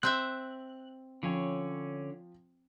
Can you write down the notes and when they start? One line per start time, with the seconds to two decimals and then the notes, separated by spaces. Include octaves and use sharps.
0.03 C4 C5 E5 F#6
1.23 D3 F3 C#4 C#5 G5